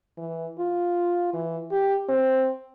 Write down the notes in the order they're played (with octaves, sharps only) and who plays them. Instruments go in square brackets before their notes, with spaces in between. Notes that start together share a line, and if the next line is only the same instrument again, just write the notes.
[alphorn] E3
F4
E3
G4
C4